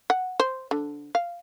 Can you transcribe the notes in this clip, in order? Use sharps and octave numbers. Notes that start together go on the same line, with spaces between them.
F#5
C5
D3
F5